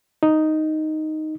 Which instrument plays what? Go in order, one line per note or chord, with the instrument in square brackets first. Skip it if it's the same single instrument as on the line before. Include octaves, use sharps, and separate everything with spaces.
[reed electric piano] D#4